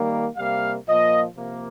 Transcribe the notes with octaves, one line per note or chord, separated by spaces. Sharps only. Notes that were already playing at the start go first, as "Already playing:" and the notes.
Already playing: D#3 G3 A#3
C3 G3 A#3 F5
A#2 F3 A#3 D#5
C3 F3 A#3